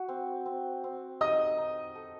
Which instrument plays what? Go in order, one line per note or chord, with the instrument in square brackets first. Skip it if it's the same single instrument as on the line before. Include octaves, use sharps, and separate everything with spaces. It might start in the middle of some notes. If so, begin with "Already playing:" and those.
Already playing: [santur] F#4
C4
C4
C4
[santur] D#4 [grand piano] D#5 D#6
[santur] D#4
A4